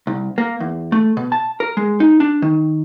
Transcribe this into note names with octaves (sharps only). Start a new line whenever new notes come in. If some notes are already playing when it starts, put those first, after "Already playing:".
C2
A#3
E2
A3
B2
A5
A#4
G#3
D#4
D4
D#3